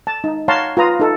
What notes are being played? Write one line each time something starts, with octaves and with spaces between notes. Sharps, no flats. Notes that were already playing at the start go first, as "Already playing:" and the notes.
A5
D#4
C#5 F5 F#5 A5 A#5 C6
F4 B4 A#5 D#6
D#4 A4